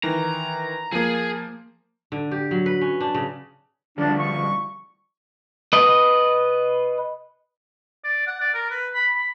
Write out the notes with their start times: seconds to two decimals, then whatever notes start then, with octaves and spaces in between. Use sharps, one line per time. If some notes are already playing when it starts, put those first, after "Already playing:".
0.03 D#3 E3 A#5
0.92 F3 A#3 G#4
2.12 D3
2.31 G4
2.51 F#3
2.66 B4
2.81 C#4
3.00 D4
3.14 C#3
3.98 D3 F3 G3 D4
4.18 C#6
5.73 B4 D#5
8.04 D5
8.27 F#5
8.41 D5
8.54 A#4
8.70 B4
8.93 B5
9.16 B5